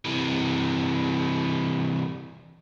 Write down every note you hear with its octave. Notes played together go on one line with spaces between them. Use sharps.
C3 E3